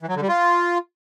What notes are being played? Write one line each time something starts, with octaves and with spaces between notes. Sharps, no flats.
E3
F#3
D3
G3
F4